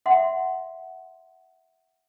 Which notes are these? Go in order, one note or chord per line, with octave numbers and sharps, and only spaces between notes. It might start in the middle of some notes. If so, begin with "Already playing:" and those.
E5 F#5 C6